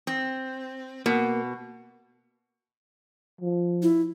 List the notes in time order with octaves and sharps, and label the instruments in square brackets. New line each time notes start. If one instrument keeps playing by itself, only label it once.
[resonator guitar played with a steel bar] C4
[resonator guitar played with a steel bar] B2 [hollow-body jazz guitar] A#3
[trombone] F3
[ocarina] E4